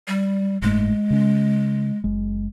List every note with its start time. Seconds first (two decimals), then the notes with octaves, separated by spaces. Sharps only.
0.08 G3
0.62 F#1 G#2 G#3 A3
1.10 C#3 C#4
2.04 F#1 G#3